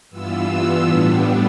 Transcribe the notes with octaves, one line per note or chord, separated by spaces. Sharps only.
G2 E3 B3 F4 E6
A2 G3 B3 D4